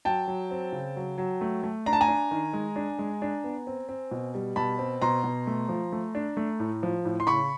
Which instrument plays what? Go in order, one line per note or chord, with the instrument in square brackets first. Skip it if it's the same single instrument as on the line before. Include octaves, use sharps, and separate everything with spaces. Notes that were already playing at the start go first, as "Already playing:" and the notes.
[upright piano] F#3 G5 A5
F#3
C4
C#3
F#3
F#3
A3
A3
D4 A#5
A5
G#5 A#5
D4
D#3
G#3
D4
G#3
D4
B3
C4
C4
B2
G3
B2 A5 B5
C4
B2 A#5 C6
B2
A3
F3
A3
D4
A3
A2
F3
A2
C6
C#3 B5 C#6